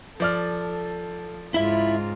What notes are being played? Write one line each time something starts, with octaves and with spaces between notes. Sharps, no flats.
F3 A4 D5 F6
G#2 C#3 E4 F4 E5